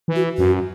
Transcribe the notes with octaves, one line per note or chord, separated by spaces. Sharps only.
E3
F#4
F#2 F#4